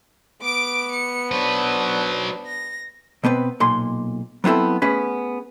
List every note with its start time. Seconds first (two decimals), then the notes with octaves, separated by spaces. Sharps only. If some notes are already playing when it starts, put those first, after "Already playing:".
0.42 B3 D6 D7
0.93 C#7
1.32 F#3 D4 B4 C5
2.47 A#6
3.24 B2 B3 C4 B4
3.60 B1 A#2 C6
4.44 F#3 B3 C4 E4 A4
4.82 A3 B3 C#4 G#4 B4